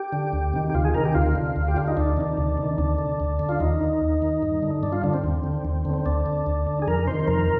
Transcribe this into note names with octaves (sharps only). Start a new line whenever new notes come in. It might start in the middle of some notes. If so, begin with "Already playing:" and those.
Already playing: G4
D3
D2
C3 D#3
G4
D2 F4
G#4
C3 D#3 A#4
G4
D2 F4
D3
D2
G4
D3 F4
D#4
D2 D4
C3 D#3
D2
C3
D#3
D2 D4
D3
D2
D3
F4
D#2 D#4
D#3
D#2
D#3
G2
D3
G2 D4
F4
D3 D4
C4
D#2
D3
D#2
D3
C4
D2 D4
D3
D2
D3
G#4
F2 A#4
C3 D#3 C5
F2 A#4